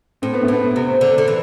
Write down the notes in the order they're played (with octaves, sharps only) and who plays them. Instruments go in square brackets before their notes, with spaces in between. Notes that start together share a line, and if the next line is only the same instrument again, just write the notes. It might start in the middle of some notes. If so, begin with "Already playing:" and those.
[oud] A2 [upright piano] C4
[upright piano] B3
A3
[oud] A2 [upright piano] B3
[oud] C3
D3
D3
E3